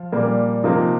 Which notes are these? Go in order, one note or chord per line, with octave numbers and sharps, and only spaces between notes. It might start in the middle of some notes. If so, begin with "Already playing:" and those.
Already playing: F3 F4
A#2 G3 A#3
C3 F3 A#3 D#4